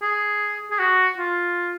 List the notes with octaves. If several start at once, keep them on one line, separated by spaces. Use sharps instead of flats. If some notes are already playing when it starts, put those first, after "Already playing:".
G#4
G#4
F#4
F4